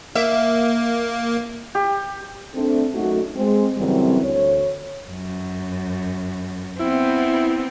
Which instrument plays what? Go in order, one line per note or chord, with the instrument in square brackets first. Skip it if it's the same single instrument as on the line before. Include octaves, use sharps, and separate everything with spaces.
[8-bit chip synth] A#3 [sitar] E5
[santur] G4
[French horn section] A3 C4 D4
F#2 A3 D#4 F#4
G#3 C4
F#2 C#3 E3 G3 C4
D2 C#5
[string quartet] F#2
[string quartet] B3 C4 [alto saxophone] E4